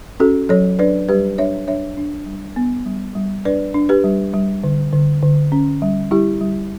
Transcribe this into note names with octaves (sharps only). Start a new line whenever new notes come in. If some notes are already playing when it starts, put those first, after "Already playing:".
C#4 F#4 A4
F#3 A4 C#5
D4 B4 D5
G3 G4 B4
D4 C#5 E5
D4 C#5 E5
D4
G3
B3
G3
G3
D4 B4 D5
D4
G4 B4
G3
G3
D3
D3
D3
C#4
G3
G3 E4 G4
G3